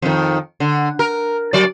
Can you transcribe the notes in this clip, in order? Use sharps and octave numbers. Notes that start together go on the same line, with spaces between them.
F2 D#3
D3
A#4
F#3 D5